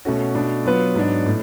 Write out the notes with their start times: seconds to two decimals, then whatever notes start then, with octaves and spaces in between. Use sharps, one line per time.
0.05 B2 A3 C#4 F#4
0.35 B2 A3 D4
0.65 F#3 B3 F4 B4
0.95 G#2 F#3 B3 D4
1.26 A2